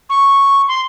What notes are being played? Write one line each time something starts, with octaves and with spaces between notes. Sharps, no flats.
C#6
C6